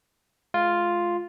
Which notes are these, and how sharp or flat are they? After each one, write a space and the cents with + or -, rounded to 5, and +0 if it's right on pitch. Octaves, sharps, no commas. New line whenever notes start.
G#3 +35 F4 +0